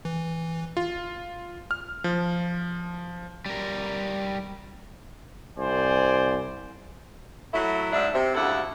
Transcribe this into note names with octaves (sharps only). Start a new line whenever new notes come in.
E3
F4
F6
F3
G3 A#4
C2 C5 D5 G#5
F#3 A3 E4
G#2 D4 E5
C3
D2 C#3 G3 E4 A4 F#5